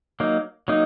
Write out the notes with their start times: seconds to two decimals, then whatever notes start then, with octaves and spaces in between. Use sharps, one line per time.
0.20 F#3 A#3 D#4
0.68 F#3 A#3 D#4